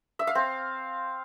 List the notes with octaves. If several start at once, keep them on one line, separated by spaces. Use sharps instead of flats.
E5
F5
C4